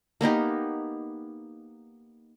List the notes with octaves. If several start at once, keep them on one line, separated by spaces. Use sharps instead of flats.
A#3 B3 D#4 G4